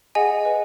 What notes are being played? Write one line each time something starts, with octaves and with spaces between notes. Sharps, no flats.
G#4 D#5 F#5 G#5
B4 D#5 F#5